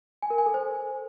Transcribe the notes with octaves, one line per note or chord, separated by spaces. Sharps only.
G#5
A#4
G#5
A4
C5